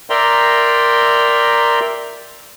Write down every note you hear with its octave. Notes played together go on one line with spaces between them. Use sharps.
A#4 D5 E5 G5 A#5 C6